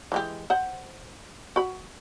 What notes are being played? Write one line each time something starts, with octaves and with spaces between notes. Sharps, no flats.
E3 G#3 G4
C5 F#5
F#4 B5